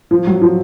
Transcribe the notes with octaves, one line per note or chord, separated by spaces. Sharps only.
F3
F#3
F3